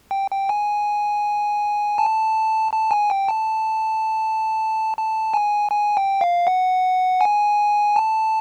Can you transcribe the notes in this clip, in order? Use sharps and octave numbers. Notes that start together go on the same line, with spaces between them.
G5
G5
G#5
A5
A5
G#5
G5
A5
A5
G#5
G#5
G5
F5
F#5
G#5
A5